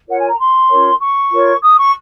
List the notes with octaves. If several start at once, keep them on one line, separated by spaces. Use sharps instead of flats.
F4 A#4 C#5 F#5
G#5
A#5
C6
C#4 F4 A#4 C#5
C#6
F4 A#4 C#5
D#6
C#6